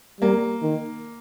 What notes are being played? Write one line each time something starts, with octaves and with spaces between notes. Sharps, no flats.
G3 A#3
D#3